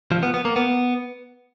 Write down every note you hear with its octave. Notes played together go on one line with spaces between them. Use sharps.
F3
B3
B3
A#3
B3